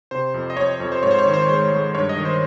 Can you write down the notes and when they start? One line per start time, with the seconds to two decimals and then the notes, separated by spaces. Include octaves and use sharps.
0.11 C3 C5
0.34 F2
0.50 D#5
0.57 F2 C#5
0.80 F2
0.92 C5
1.02 G#2 C#5
1.11 C5
1.19 C#5
1.26 D#3
1.34 C5
1.49 G#3 C5
1.72 G#3
1.95 G2 C#5
2.09 D#5
2.16 D#3
2.25 C5